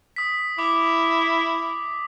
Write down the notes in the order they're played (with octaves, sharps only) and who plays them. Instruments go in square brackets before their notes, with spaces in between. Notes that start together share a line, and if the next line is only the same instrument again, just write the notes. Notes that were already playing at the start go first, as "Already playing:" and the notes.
[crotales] D#6 B6
[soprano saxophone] E4 [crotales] D6